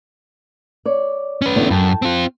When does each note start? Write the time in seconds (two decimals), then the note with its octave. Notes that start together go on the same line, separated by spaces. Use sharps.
0.85 C#5 D5
1.42 C#4 B4
1.56 E2 D3 B3
1.70 F#2 G5 A5
2.02 C4 F4